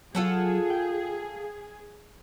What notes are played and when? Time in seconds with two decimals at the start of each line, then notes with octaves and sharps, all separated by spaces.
0.15 F#3 F4 G#4 A4 F#5
0.70 G5